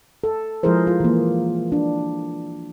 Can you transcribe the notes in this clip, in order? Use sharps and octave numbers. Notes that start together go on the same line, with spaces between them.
A4
F3 G#3 E4 G#4 A#4 C5
F4
E3 A#3
D4